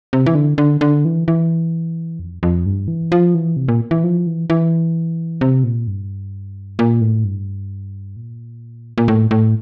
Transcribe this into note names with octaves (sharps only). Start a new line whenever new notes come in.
C3
E3
D3
D3
D3
E3
E3
F2
F2
G2
E3
F3
E3
C3
A#2
E3
F3
E3
E3
C3
A#2
G2
A#2
A2
G2
A#2
A#2
A2
A2